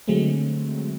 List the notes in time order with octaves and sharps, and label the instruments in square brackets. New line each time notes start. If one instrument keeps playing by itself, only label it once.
[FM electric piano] D3 F#3 G#3 A3 C4